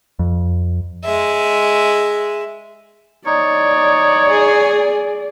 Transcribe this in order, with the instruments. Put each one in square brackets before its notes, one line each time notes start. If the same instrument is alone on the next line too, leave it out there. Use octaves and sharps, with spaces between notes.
[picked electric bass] F2
[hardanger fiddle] G#3 E5
[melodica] D#4 [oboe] C#5 [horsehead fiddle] D5
[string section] G#4